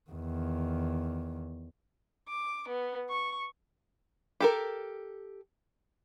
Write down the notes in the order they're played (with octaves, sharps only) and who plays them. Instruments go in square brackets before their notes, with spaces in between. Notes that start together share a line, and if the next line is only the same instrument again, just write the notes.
[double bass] E2 D#3
[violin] D6
B3
C#6
[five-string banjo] G4 A4 A#4